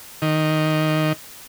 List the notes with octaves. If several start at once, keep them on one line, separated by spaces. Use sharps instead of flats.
D#3